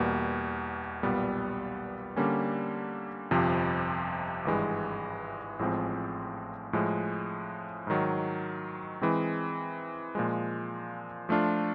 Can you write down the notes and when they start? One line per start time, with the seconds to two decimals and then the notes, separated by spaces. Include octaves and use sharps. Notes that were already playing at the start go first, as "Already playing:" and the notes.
Already playing: E2 B2 G3 A#3
1.03 B1 A#2 G3 B3
2.16 D3 G3 A#3 C#4
3.31 G1 F2 C3 F3
4.45 G#1 G2 E3 G#3
5.59 A1 A2 F3 G#3 C4
6.73 A2 F3 G#3
7.87 G#2 D#3 F#3
9.02 E3 G#3 C4
10.15 A#2 F3 G#3
11.29 F3 A3 D4 F4